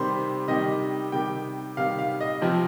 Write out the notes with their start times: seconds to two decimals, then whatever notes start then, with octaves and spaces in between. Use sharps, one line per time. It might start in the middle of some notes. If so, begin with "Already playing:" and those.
Already playing: C3 D#3 G3 C5
0.48 C3 D#3 G3 D#5
1.12 C3 D#3 G3 G5
1.77 C3 D#3 G3 F5
1.99 F5
2.21 D#5
2.42 C3 F3 C4